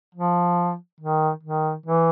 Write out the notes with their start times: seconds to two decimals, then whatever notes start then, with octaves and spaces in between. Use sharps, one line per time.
0.15 F3
1.00 D#3
1.43 D#3
1.86 E3